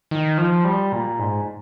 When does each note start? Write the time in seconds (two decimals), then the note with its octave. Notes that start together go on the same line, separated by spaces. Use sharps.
0.11 D#3
0.38 F3
0.64 G3
0.92 A#2
1.19 G#2